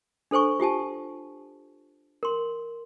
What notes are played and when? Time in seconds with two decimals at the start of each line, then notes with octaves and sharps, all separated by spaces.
0.31 D4 A4 C5 G#5 C#6
0.60 F4 G4 G#5 A5
2.23 A#4 C6